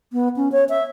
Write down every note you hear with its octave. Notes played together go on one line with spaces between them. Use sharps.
B3
C#4
C#5
E5